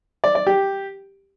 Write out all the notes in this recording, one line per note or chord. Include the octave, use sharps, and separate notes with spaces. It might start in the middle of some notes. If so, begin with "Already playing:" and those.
D5
D5
G4